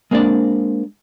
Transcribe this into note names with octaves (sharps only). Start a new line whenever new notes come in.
G#3 A#3 C4 D4 D5